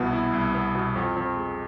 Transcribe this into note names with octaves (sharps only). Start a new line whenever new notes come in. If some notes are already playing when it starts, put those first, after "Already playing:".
Already playing: C2 B2 B3 E4
E4
C2
B3
B2
F2
F2
G#3